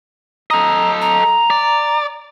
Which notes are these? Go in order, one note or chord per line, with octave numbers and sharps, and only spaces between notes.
A4 D#5 A#5
A#5
D5